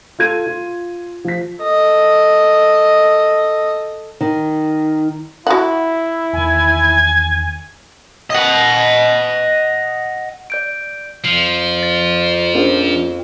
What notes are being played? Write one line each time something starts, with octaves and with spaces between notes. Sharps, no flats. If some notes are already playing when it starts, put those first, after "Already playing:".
F4 A4 G#6 D#7
F4
F3 B6
A4 D#5
D#3
E4 F#4 F#5
E2 D#3 G#5
D#5 F#5
D5 G6 D7
F2 F3 C7
A6
A#1 C#4